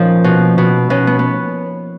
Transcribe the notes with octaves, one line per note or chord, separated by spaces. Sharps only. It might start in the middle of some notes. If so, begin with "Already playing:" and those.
Already playing: A#2 F3 C#4 D#4 F4
B2
B2
B2 C#4
B3
B3